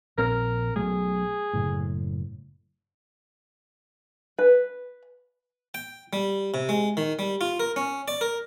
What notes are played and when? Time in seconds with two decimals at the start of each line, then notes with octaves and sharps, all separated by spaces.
0.18 A#1 C4 A#4
0.76 B1 F#3 A3 G#4
1.53 F#1 A2
4.39 B4
5.74 G5
6.13 G3
6.54 C3
6.69 G#3
6.97 D#3
7.19 G3
7.41 F4
7.60 A#4
7.76 C#4
8.08 D5
8.21 A#4